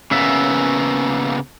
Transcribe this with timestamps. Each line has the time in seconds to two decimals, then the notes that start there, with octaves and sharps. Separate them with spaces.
0.11 C#3 A#3 B3 C#4 E5